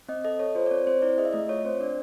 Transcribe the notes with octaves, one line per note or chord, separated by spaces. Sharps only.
C4 D#5
A4 D#5
A4 C#5
F4 C5
D5
C4 C#5
C4 C5
E4 D5
G#4 D#5
E5
A3 D#5
F4 C#5
C4 C5
D4 D5